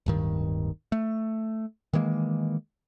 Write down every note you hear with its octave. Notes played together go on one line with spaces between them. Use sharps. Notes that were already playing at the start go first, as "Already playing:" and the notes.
D1 G2 D#3
A3
D#3 E3 G#3 A#3